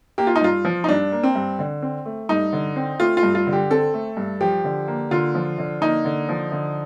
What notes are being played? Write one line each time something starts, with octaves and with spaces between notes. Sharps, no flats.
A#3 G4
F4
D#4
G2 F4
F3
D#4
G2 D4
A#3
C4
G2
D3
C4
A3
G2 D#4
D3
C4
A3 F4
F4
G2
F4
D3
G4
C4 A4
A3
G2
F3 G4
D3
A#3
D3 F4
F3
D3
A#3 D#4
D3
F3
D3